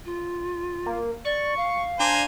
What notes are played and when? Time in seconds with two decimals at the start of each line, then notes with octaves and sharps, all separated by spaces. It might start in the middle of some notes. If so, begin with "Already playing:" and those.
0.05 F4
0.86 A#3
1.25 D5 C#6
1.57 F5
2.00 D4 C5 G#5 A#5